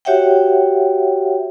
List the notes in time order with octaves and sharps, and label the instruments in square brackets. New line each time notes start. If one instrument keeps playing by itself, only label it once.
[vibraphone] F#4 G4 C#5 E5 F#5 G5